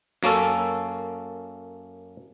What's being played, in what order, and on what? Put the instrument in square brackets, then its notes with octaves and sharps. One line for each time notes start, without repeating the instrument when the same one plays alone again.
[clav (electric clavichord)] F#2 A#3 C#4 A4